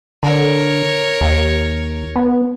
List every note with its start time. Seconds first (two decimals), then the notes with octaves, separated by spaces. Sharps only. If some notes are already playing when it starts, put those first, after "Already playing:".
0.23 D3 A#4 C#5
1.21 D#2
2.16 B3